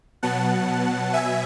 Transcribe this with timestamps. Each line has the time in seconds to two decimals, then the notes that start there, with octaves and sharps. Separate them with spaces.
0.23 B2 F#3 B3 F#5 A5
1.14 E5 G#5